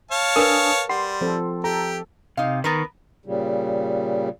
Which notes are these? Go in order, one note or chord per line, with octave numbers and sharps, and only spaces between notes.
C#5 F5 A5
D4 A#4 B4 G#5 D#6
G3 F#5 C6
F3 C4 A4
G4 A4 A#5
C3 D#4 F5
D#3 B3 A#4 B4
A#2 C#3 G3